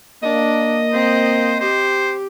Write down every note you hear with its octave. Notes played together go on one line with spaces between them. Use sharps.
A#3 D4 D#5
C4 C5
G4 C5